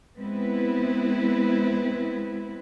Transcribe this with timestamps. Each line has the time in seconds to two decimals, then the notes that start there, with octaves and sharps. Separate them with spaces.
0.18 G#3 B3 C4 E4 B4